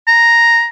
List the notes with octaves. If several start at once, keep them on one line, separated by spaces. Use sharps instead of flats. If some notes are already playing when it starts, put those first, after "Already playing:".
A#5